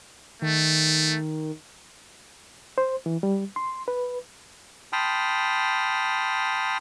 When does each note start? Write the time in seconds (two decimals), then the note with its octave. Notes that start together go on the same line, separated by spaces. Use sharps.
0.42 D#3 A3
2.78 C5
3.06 E3
3.23 G3
3.56 C6
3.88 B4
4.93 G5 A5 B5 C6 D#6 F6